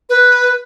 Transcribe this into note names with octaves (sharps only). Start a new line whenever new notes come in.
B4